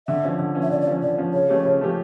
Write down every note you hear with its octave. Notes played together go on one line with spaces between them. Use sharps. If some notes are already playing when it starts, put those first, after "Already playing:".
D3 E5
F3 C#4
D3
F3 C#4
E5
D3 D5
D5
F3 C#4
D3 D5
F3 C#4
C#3 C#5
F3 A3 C#4 G4
C#3
F3 A3 C#4 G4